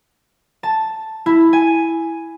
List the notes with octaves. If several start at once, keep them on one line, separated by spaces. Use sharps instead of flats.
A5
E4
G#5